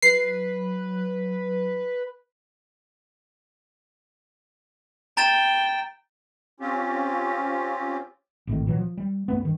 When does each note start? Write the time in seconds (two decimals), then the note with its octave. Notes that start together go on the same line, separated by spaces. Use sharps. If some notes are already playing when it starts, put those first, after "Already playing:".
0.02 F#3 B4 C7
5.17 G5 A#5 A6 E7
6.60 C4 C#4 F4 G4
8.47 G#1 A2 D#3
8.67 A#2 E3 F#3
8.79 F3
8.97 G3
9.28 F#2 A3 B3
9.42 G2 D#3